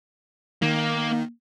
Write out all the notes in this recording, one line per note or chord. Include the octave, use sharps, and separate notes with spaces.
D#3 A#3